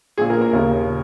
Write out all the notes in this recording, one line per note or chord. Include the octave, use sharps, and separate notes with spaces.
A#1 A#2 G#4
A#4
A#4
D#2 C#3